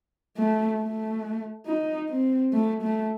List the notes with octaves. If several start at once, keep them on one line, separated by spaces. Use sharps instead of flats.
A3
A3
D#4
C4
A3
A3